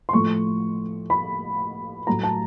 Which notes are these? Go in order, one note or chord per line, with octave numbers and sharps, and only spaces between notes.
C6
A2 F3 A3 C#6
B5
A2 F#3 A3 A#5
A5